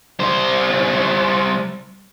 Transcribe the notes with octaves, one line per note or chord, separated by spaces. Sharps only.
G3 C5